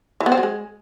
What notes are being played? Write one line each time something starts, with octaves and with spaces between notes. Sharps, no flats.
E3
B3
C4
F#3
G#3